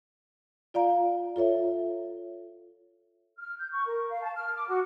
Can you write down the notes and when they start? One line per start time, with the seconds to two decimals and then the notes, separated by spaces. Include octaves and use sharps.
0.74 F4 D5 F5 A#5
1.36 F4 A4 C#5 E5
3.38 F6
3.57 G6
3.71 C#6
3.87 A#4
4.10 F5
4.22 A5
4.35 F6
4.55 D6
4.67 F#4